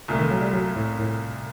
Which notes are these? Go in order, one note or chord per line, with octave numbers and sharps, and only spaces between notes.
C2 A#2 A3
D#3
F#3
G3
F#3
A2
A2